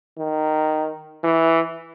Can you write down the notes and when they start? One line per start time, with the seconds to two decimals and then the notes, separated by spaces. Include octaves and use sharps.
0.18 D#3
1.23 E3